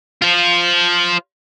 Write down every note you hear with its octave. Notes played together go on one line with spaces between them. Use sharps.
F4 C5